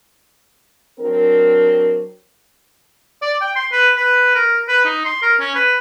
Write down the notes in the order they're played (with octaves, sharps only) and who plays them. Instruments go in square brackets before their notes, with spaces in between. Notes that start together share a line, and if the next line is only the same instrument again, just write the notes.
[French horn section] F#3 C4 D4 A#4
[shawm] D5
G5
C6
B4
B4
A#4
B4
D#4
C6
A#4
C#4
B4